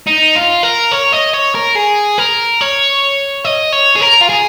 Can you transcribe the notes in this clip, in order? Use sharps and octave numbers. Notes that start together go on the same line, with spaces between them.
D#4
F4
A#4
C#5
D#5
C#5
A#4
G#4
A#4
C#5
D#5
C#5
G#4
A#4
F4
G#4